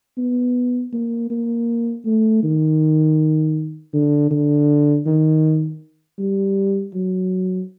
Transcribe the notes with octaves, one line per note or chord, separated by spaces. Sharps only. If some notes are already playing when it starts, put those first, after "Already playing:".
B3
A#3
A#3
A3
D#3
D3
D3
D#3
G3
F#3